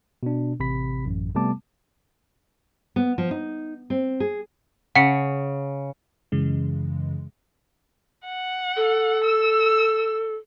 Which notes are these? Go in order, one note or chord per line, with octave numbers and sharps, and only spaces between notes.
B2 D4
A1 C3 B5 B6
A1 F#2
C3 G3 A3 B3 A5 D6
B3
F3
D#4
C4
G#4
C#3 F#5 C#7
F#2 C#3 E3 G#3
F#5
A4
E6